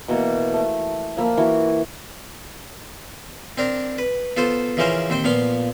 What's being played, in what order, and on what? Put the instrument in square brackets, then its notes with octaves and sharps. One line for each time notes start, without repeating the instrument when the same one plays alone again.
[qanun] B2 E3 A#3
A3
F3 A#3 B5
E3 E4 F#4
[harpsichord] C4 D4 A#4
B4
B3 F4 A4 C5
C#3 E3 F3 C#4 A#4 C5
D#2 C4 C5 G5
A#2 F3 B3 F5 C6